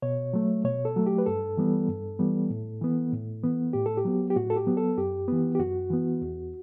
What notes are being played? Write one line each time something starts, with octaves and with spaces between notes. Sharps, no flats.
B2 C#5
F#3 A3
B2 C#5
A4
F#3 A3
G4
B4
G2 A4
E3 G3 B3
G2
E3 G3 B3
A2
E3 B3
A2
E3 B3
A2 G4
A4
G4
F#3 B3
G4
A2 F#4
A4
G4
F#3 B3
A4
F#2 G4
E3 B3
G4
F#2 F#4
E3 B3
E2